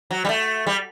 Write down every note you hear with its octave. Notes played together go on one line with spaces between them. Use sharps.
F#3
G3
A3
G3